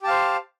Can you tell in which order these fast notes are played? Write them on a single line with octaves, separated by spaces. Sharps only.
G4 A5 F5 C5